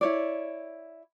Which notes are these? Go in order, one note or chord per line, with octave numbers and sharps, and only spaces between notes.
E4 C#5 D5